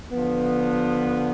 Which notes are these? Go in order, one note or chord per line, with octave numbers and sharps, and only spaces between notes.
D3 F3 B3